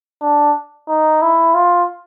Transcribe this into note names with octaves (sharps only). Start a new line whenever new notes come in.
D4
D#4
E4
F4